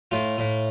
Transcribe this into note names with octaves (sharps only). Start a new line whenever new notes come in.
A2 F4
A2